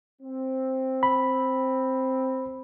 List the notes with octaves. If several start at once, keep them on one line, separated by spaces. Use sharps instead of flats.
C4
B5